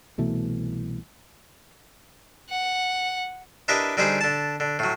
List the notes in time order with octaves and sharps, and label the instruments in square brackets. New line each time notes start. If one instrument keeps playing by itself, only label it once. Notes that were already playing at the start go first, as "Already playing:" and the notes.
[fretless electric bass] C2 B2 E3 A3
[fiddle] F#5
[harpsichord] D4 E4 G4 A#4 B4 D#5
D3 G3 D#4 G4 G#4 C5
D3 A5
D3
A2 F#3